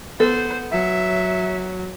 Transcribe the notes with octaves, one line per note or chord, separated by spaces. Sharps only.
B3 A4 C5
F#3 E5